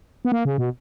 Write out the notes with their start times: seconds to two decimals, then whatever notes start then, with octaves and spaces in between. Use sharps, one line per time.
0.25 B3
0.32 A#3
0.45 C#3
0.58 B2